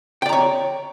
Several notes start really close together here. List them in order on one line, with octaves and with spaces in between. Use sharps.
G5 D5 A#5 C#5